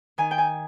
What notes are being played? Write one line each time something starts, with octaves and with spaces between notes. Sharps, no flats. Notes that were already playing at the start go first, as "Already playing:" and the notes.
D#3 G#5
G5
G#5